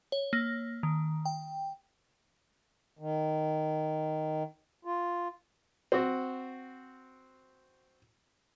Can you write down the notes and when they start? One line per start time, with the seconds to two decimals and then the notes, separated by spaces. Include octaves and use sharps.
0.12 C#5
0.33 A#3
0.83 D#3
1.25 G5
2.99 D#3
4.85 F4
5.92 C4 F#4